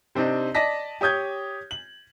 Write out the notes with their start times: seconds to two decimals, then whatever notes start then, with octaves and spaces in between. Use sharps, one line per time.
0.15 C3 C4 D4 D#4
0.55 D5 D#5 A5 A#6 B6
1.01 G4 C#5 D#6 G6 G#6
1.71 F#7